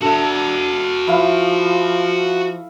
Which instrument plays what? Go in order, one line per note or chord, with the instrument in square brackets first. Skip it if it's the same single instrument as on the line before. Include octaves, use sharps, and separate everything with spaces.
[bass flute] D4 [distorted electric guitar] F#4 E5 [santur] A4
[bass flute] F3 [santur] E4 F5